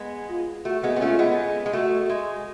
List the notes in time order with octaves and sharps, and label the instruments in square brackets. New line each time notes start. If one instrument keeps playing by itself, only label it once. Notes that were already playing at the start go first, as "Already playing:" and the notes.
Already playing: [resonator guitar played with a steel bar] G#3 B3
[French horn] F4
[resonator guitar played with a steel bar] A3 [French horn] F#4
[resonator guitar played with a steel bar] G#3 B3
B3
[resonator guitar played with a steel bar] A3 C#4 [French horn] F4
[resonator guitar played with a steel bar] G#3 B3
G#3
[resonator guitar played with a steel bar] A3 [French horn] F#4
[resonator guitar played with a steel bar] G#3